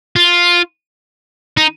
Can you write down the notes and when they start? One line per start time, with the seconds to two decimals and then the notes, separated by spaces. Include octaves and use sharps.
0.16 F4
1.57 D#4